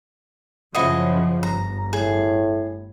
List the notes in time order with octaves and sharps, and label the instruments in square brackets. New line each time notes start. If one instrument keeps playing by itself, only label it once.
[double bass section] F#2 C#3 F3 [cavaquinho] E4 F#4 D#5
[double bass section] G1 [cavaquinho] A#5
[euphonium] A2 [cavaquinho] G#4